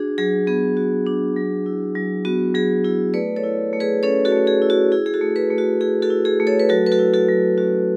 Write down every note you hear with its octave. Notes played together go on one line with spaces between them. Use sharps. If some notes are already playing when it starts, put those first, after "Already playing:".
Already playing: D4 F#4 G#4
F#3 G#4
B3 G#4
F#4
D4
F#3
E4
F#3
B3 F#4
F#3 G#4
E4 G#4
A3 B4 D5
A4 C#5
E4
A3
G#4 B4
C#4 A4 C#5
F#4 A4
A3
G#4
E4
F#4
E4 G#4
G#4
F#4 A4
A3
G#4 B4
A3
F#4
E4 G#4
F#4 A4
E4
G#4
A3
A4 C#5
B4
F#3 F#4 A4
B4
F#4 A4
E4
F#4 A4
F#3
C#4 F#4